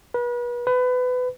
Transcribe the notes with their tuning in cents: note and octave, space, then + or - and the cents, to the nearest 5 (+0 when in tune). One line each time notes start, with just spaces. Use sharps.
B4 -35
B4 +25